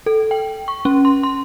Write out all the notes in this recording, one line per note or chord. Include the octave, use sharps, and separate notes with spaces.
A4
G5
C#6
C#4
C6
C6